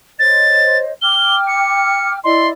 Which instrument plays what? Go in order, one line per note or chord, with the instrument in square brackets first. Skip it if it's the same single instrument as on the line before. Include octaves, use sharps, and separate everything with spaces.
[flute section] C5 C#5 D#5 [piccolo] A6
[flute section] G5 D6 F6 [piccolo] G7
[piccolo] C#7
[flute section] E4 D5 D#5 [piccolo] C6